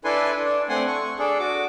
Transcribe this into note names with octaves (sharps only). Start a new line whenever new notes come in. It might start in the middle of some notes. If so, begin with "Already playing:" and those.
D4 E4 A4 B4 G#5 C6
D4
A3 C4 F#5 G#5 C6
C#6
D4 G#4 A4
F#4 D6